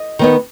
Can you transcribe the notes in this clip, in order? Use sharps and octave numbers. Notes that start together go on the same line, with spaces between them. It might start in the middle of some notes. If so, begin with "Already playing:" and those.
Already playing: D#5
D#3 B3 D#4